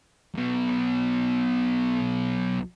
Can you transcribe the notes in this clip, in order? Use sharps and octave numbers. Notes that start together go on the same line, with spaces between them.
B1 B2